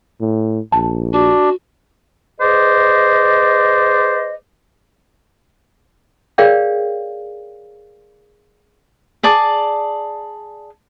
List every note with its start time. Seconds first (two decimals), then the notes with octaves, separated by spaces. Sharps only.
0.21 A2
0.72 A#1 A5
1.13 D4 F#4
2.40 G#4 B4 C5 D5 D#5
6.38 G#4 A#4 C#5 D5 F5 G5
9.23 G#4 D5 A5